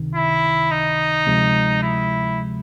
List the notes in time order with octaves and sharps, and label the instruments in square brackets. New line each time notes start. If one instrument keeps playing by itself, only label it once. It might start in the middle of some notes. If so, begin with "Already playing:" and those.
Already playing: [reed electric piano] C#2 C3 D#3
[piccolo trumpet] E4
D#4
[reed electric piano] D2 C3 F3 G#3
[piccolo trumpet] E4